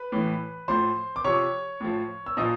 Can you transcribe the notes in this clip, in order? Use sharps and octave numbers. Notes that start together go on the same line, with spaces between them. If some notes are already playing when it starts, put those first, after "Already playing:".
Already playing: B4 B5
A2 E3
A2 F3 C5 C6
D6
C3 F3 C#5 C#6
A2 F3
E6
A#2 F3 D#5 D#6